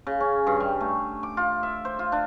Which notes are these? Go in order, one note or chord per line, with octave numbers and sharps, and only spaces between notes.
C#3
C#4
G2
G3
A3
D6
F4
E5
C5
F4
D4